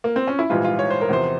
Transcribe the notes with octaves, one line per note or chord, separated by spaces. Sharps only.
A#3
C4
C#4
E4
A#1 G#2 E3 G3 F4
F4
C#5
C5
A#4
E2 C3 F3 C5